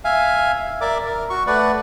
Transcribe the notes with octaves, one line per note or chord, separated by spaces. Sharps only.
E5 F5 G#5
A#4 D5 E5 D6
A#4
F#4 C#6
A3 B4 D5 F#5